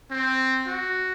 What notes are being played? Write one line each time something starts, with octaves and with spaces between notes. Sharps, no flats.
C4
F#4